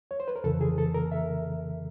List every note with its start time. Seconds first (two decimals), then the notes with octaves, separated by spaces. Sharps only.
0.11 C#5
0.20 C5
0.28 B4
0.36 A#4
0.44 F2 C#3 E3 A4
0.61 G#4
0.78 A4
0.94 A#4
1.12 E5